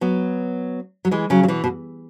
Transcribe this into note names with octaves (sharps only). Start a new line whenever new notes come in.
F#3 B3
F#3
E3 G#3
C#3 F#3
F#3
B2 E3
B2